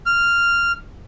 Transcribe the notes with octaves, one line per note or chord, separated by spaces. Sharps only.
F6